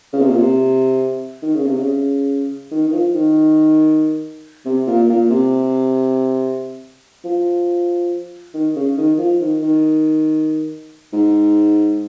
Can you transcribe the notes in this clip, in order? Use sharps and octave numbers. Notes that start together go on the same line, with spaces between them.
C#3
C3
A#2
C3
D#3
C#3
C3
C#3
D#3
D#3
F3
D#3
C3
A#2
A#2
C3
F3
D#3
C#3
D#3
F3
D#3
D#3
G#2